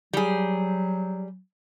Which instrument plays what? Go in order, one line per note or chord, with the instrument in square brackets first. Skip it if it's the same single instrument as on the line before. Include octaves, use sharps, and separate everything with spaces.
[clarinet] F#3 [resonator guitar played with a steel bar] G3 G#4